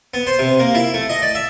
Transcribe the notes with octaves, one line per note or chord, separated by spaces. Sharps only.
B3
C5
C3
A#3
E4
A3
D#5
D5
E5